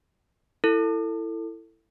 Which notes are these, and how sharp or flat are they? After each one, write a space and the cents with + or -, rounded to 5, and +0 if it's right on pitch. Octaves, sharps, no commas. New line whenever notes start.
E4 +10 A4 +25